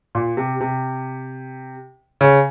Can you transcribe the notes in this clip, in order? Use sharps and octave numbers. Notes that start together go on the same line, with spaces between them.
A#2
C3
C3
C#3